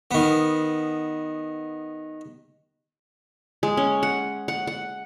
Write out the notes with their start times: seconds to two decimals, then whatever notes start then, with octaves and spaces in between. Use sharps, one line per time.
0.11 D#3 B3
3.63 G#3
3.77 C#4
4.03 F#5
4.48 F#5
4.67 F#5